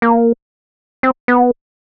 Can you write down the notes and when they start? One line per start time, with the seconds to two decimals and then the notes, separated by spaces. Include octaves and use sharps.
0.02 A#3
1.03 C4
1.28 B3